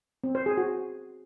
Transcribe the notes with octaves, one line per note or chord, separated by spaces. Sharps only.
C4
C5
G#4
F#4